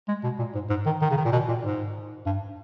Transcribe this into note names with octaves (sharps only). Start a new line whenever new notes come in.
G#3
B2
A#2
G#2
G#2
D#3
D#3
C#3
D#3
A#2
B2
A#2
G#2
G2